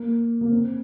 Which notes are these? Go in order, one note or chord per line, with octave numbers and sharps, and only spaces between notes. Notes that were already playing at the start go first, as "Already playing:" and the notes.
Already playing: A#3
A#3
C4